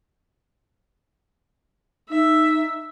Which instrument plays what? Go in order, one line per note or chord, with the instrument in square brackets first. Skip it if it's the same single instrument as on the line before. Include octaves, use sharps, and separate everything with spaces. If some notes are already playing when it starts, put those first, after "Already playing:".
[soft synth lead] D#4 [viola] E5